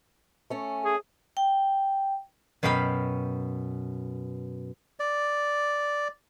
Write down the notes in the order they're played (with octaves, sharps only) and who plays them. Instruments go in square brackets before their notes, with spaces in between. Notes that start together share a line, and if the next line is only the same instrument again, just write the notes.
[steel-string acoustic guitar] A3 C#4
[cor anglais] G#4
[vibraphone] G5
[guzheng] F#2 B2 F5 G5 B5
[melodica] D5